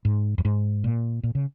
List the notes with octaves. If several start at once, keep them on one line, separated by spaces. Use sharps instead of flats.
G#2
F2
G#2
A#2
A#2
C#3